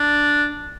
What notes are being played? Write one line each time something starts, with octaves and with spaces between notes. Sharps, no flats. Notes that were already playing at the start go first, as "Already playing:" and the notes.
Already playing: D4